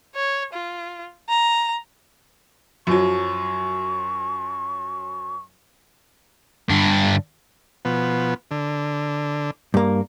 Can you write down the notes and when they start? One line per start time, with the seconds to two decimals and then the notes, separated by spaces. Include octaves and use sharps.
0.15 C#5
0.53 F4
1.29 A#5
2.87 F#2 F3 F#3 C#6
6.69 G2 D3
7.85 B2 F3 B3
8.51 D3
9.74 G2 A#3